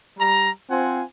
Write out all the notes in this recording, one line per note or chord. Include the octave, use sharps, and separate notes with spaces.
G3 A#5
C4 F4 C5 F#5 G#5